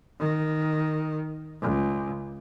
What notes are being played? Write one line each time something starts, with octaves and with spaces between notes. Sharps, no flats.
D#3
C#2